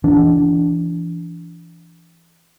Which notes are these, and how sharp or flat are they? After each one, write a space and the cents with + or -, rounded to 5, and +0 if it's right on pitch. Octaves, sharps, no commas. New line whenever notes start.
E3 +30 D4 -20